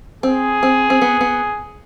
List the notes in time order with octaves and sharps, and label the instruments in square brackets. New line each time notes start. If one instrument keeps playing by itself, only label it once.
[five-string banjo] C4 [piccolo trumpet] G#4
[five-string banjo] C4
C4
B3
B3